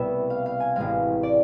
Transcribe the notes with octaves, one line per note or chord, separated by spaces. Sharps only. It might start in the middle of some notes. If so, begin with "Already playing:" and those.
Already playing: C2 B2 A3 B3 E5
F5
F5
G#5
A1 A2 G#3 C4 F5
D5